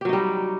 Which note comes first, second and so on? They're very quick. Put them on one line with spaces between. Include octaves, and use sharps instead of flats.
G4 F#3 D#4 G3